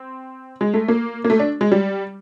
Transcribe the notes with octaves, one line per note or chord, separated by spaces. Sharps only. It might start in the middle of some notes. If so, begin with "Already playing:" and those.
Already playing: C4
G#3
A3
A#3
A#3
A3
D4
G#3
G3